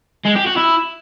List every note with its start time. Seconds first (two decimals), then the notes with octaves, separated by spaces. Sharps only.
0.25 G#3
0.35 G4
0.46 F#4
0.57 E4